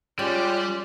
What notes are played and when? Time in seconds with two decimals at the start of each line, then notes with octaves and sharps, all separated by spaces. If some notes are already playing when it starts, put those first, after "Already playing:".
0.19 G3 G#3 C#4 F4 G4 D5 F#6